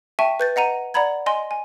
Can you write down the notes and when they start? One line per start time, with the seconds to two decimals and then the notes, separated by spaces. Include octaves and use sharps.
0.19 E5 G5 A5 C#6 D#7
0.40 B4 G6 A6
0.56 D#5 F#5 A#5 D#7
0.94 D5 F#5 A#5 B5 G#6
1.26 D#5 G#5 C6
1.51 G#5